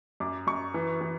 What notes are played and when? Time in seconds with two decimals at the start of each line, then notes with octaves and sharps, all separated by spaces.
0.20 F#2 D6
0.47 F#2 C#6
0.74 E3
1.01 E3